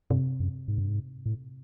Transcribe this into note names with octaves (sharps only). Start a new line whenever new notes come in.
G2 C3
F#2
G#2
G2
G#2
A2